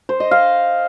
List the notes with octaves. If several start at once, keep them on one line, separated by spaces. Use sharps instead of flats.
C5
D#5
F5